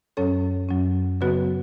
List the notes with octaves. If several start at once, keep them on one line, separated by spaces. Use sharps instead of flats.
F#2 F#3 C#4 A4 C#5
F#2 F#3 C#4
C#3 F#3 B3 F#4 B4